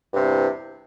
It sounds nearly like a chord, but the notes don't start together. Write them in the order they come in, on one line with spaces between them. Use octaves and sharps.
G2 C3 E2